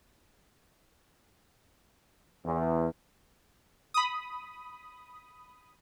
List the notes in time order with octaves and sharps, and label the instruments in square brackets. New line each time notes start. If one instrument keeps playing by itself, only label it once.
[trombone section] E2
[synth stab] B5 D#6